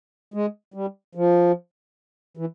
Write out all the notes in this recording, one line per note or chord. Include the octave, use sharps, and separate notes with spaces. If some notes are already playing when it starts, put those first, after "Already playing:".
G#3
G3
F3
E3